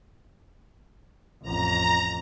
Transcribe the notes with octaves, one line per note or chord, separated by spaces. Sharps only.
A1 F2 A#5